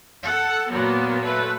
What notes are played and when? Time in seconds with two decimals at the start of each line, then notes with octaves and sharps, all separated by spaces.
0.23 A4 F#5
0.71 A#2 F#3 A#3 B3
1.22 A3 B4